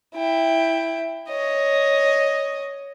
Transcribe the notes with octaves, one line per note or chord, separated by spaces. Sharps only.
E4 G5
C#5 D#5